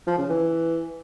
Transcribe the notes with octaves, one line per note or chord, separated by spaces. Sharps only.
F3
C#3
E3